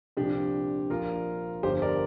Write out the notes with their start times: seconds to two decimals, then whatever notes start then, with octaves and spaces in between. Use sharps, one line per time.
0.17 C2 A#2 F3 D4 G4
0.90 A#1 A#2 F3 F4 A#4
1.63 G1 G2 F3 G4 C5
1.82 A#4 D5